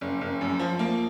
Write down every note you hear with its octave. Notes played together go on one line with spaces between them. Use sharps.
F#1
F#1
F#2
F3
A#3